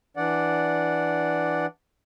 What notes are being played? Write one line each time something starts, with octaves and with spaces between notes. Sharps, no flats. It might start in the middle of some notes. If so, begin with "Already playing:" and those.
E3 D4 D5 F#5